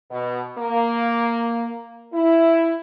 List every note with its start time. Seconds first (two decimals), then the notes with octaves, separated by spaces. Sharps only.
0.11 B2
0.58 A#3
2.13 E4